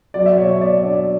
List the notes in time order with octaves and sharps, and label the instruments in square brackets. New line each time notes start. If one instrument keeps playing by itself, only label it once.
[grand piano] F#3 D5
E5
B2 C#5
C#5
B3 D5
D5
D4
D5